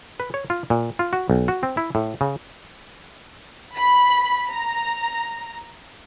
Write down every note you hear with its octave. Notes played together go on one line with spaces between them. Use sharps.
B4
C#5
F4
A#2
F4
F#4
B1
F#4
C4
E4
A2
C#3
B5
A#5